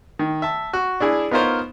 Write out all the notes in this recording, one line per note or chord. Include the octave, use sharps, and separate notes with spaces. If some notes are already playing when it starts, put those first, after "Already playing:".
D#3
E5 A5
F#4
D4 E4 G#4
B3 D#4 F4 A#4 C5 C#5